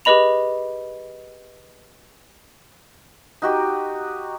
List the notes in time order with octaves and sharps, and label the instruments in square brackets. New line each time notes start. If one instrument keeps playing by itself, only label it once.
[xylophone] G4 G#4 B4 D#5 B5 F7
[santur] D#4 F#4 G4